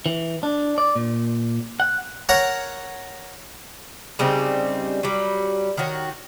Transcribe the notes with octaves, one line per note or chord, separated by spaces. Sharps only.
E3
D4
D5
A#2
F#5
A#4 C#5 F#5 A#5
C#3 G3 C4 D#4
F#3 G3
D#3 F#4 C#5